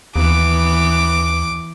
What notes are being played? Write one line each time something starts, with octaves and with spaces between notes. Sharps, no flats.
D#2 E3 B3 D6